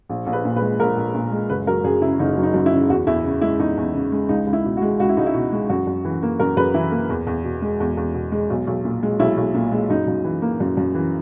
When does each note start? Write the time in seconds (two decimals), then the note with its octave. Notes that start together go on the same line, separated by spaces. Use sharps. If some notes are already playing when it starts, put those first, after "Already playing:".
0.09 A#1
0.26 A#1
0.33 B4
0.45 A#2
0.57 B4
0.62 G#3
0.80 A#1 A#4
0.97 A#1
1.14 A#2
1.32 G#3
1.50 F#1 B4
1.67 F#3 A#4
1.84 F#2 G#4
2.02 C#3 E4
2.19 F#1 D#4
2.37 F#3
2.43 D#4
2.54 F#2
2.66 E4
2.72 C#3
2.90 E2 F#4
3.07 E2 E4
3.24 C#3
3.41 G#3 E4
3.60 E2 D#4
3.77 E2
3.94 C#3
4.12 G#3
4.29 C#2 D#4
4.47 C#2
4.53 E4
4.65 B2
4.77 F#4
4.82 G#3
4.99 C#2 F#4
5.09 E4
5.17 C#2 D#4
5.26 E4
5.34 B2
5.52 G#3
5.69 F#2 F#4
5.87 F#2
6.05 E3
6.23 A#3
6.39 F#2 A#4
6.57 F#2 B4
6.74 E3 E4
6.92 A#3
7.09 E2
7.27 E2
7.44 B2
7.62 G#3
7.80 E2
7.97 E2
8.14 B2
8.32 G#3
8.50 B1
8.67 B1
8.85 A#2
9.03 G#3
9.19 B1 E4
9.37 B1
9.54 A#2
9.72 G#3
9.90 F#2 D#4
10.08 F#2
10.24 E3
10.42 A#3
10.60 F#2
10.77 F#2
10.95 E3